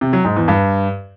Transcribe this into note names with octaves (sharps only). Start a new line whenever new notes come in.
C3
F#3
G#2
E2
G2